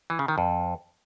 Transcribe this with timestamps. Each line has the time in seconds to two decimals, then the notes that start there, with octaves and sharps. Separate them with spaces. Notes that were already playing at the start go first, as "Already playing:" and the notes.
0.10 E3
0.19 C#3
0.28 D#3
0.38 F2